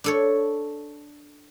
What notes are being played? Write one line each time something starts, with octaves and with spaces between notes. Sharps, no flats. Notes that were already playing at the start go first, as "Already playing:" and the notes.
D4 A4 C#5